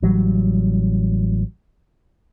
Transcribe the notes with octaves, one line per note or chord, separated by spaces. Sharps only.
A1 E3 F#3 G3